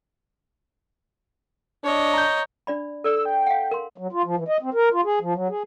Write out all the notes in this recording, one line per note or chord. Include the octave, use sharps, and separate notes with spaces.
D4 C#5 D#5
A#5 G6
D4 D5 B5
A4 D5 E6
G5
F5 F#5
A#4 C6
F#3
F4
F3
E3
D#5
C4
A#4
F4
G#4
F3
F#3
G#4